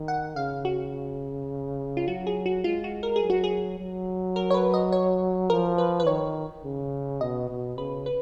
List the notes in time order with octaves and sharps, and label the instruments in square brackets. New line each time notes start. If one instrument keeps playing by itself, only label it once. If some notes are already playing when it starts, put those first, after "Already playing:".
Already playing: [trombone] D#3
[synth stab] F#5
[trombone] C#3 [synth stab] F5
[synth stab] F#4
F4
[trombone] F#3 [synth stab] F#4
[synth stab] G#4
F#4
[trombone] G#3 [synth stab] F4
[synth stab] F#4
A#4
G#4
[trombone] F#3
[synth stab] F#4
G#4
[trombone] F#3
[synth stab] A#4
C#5
B4
D#5
C#5
[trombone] F3 [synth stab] A#4
[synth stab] B4
B4
[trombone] D#3 [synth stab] C#5
[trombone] C#3
[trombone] B2 [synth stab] D#5
[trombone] B2
[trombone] C#3 [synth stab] B4
[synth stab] B4